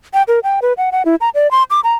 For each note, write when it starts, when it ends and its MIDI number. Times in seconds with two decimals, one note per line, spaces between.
0.14 0.23 79
0.28 0.39 70
0.43 0.60 79
0.62 0.73 71
0.77 0.90 78
0.92 1.03 78
1.05 1.15 64
1.21 1.29 82
1.35 1.50 74
1.51 1.63 84
1.70 1.80 86
1.84 1.94 82